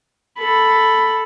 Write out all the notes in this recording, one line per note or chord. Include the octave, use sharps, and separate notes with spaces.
A4 B5